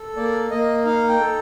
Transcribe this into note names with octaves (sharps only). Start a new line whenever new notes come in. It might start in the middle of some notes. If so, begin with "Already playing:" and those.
Already playing: A4
A#3 D5
A#3 D#5
D#4 F5
G5
A4